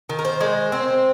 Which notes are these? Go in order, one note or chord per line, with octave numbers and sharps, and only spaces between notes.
D#3
A#4
C5
G#3
C4